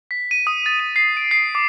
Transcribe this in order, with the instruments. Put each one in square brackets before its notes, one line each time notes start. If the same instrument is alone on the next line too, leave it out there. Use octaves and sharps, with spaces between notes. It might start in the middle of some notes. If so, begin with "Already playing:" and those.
[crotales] B6
D#7
D#6
A6
D#7
C7
D7
C7
D6